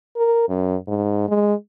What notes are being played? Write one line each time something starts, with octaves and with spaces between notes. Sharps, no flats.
A#4
F#2
G#2
G#3